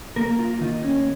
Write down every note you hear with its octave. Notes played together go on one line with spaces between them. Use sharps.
A#3 A#4
F4
D#3 D#4
C#4